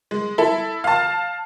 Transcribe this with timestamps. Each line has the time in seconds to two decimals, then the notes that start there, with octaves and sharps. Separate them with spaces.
0.11 G#3
0.38 E4 A4
0.84 F5 A5